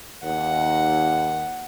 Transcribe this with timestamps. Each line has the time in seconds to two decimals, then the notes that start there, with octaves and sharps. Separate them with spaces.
0.24 D#2 F#5